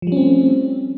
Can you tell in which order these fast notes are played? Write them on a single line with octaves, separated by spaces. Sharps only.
F3 G3 C#4 C4 A3